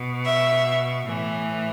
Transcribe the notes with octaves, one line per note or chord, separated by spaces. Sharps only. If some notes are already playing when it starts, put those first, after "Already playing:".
Already playing: B2
E5
A2 E3